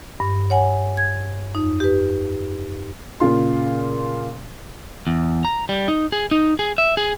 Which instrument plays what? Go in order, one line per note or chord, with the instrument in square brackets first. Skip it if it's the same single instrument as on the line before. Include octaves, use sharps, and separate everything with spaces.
[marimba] G2
C#5 F#5 G#5
G#6
F2 D#4
G4 B4
[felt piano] A#2 C#3 F4 C6
[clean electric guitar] E2
A#5
G3
D#4
G#4
D#4
G#4
E5
G#4